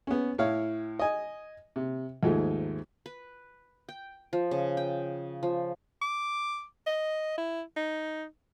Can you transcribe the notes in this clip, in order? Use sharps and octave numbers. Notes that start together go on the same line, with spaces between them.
B3 C#4
A2 E4 C#5 F5
D#5 G#5
C3
D#2 G#2 F3 A3
B4
G5
F3
C#3
G5
F3
D6
D#5
E4
D#4